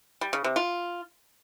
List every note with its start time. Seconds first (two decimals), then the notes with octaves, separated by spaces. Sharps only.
0.21 G3
0.33 C#3
0.44 C3
0.56 F4